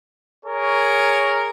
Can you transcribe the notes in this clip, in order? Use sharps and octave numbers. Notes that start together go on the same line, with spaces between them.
G#4 A#4 C#5